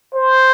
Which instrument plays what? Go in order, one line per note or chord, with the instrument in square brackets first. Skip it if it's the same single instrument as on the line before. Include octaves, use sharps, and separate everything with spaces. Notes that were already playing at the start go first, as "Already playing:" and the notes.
[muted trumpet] C5